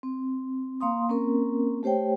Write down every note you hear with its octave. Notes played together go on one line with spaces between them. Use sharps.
C4
A#3 F5 C6 D#6
A#3 C4 C#4 A#4
A3 G4 C5 C#5 G5